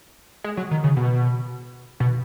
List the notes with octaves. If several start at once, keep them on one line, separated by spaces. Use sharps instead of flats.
G#3
F#3
D#3
C#3
B2
B2